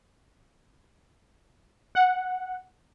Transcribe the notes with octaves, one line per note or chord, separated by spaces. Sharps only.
F#5